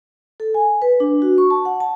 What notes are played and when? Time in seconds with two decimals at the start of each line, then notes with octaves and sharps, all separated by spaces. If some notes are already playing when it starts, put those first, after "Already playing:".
0.40 A4
0.54 G#5
0.82 B4
1.00 D4
1.22 F#4
1.38 C#6
1.51 A5
1.65 F#5
1.80 A5